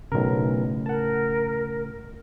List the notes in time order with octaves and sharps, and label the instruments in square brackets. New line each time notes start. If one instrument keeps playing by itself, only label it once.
[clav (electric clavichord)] B1 A#4 [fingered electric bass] A2 C#3
[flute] A#4 [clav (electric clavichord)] F#5 A5